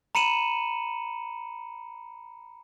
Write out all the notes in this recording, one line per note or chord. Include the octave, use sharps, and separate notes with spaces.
A#5 B5 C#7 D#7 E7 F#7